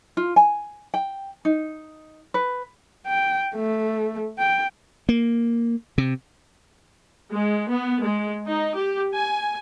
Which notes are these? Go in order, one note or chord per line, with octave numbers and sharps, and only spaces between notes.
F4
G#5
G5
D#4
B4
G5
A3
G5
A#3
C3
G#3
B3
G#3
D#4
G4
G#5